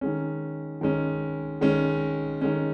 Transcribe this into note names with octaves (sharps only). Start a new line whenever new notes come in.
D#3 G#3 C#4
D#3 G#3 C#4
D#3 G#3 C#4
D#3 G#3 C#4